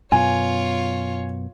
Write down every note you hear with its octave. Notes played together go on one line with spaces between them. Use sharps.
F#2 B2 B3 F4 C#5 G#5